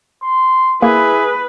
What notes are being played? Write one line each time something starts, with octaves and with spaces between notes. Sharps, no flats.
C6
A#3 E4 G#4 B4